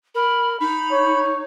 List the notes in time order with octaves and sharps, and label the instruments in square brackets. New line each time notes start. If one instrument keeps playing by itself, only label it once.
[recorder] A#4 [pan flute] B5
[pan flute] D#4 [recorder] B5
[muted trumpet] C#5